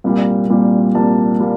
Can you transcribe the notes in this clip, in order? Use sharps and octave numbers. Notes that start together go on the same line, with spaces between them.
C2 A#2 G3 A#3
C2 A#2 G3 A#3
C2 A#2 G3 A#3 A5
A#2 G3 A#3